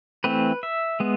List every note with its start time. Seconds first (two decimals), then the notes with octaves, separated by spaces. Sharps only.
0.24 E3 A3 C4 B4
0.63 E5
1.00 G#3 B3